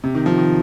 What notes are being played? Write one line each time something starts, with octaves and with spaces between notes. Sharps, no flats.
C3
D#3
F3
D#3